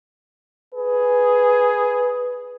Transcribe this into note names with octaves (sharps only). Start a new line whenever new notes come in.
G#4 B4